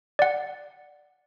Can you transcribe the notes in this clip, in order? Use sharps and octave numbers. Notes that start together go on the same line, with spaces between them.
D5 F#5